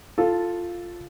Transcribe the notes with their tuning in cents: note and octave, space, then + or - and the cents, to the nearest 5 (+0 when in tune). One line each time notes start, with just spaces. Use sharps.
F4 +0 A4 +0